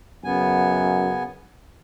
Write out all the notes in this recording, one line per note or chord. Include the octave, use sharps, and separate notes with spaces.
F#2 C#3 B3 G#5